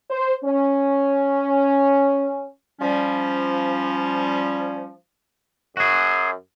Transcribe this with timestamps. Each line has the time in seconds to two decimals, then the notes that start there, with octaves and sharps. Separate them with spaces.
0.10 C5
0.45 C#4
2.79 F3 G3 C#4
5.77 F#2 F#4 G#4